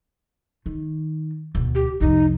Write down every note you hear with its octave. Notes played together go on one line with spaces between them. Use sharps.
D#3
D2 B2
G4
C2 F2 D#4